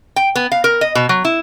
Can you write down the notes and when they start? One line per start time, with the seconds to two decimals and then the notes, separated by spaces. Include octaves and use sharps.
0.16 G5
0.35 B3
0.52 F5
0.64 A#4
0.81 D#5
0.95 B2
1.09 F#3
1.25 E4